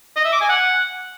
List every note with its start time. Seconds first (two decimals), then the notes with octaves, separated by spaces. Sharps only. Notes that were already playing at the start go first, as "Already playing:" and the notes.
0.16 D#5
0.25 E5
0.33 D6
0.41 G#5
0.49 F#5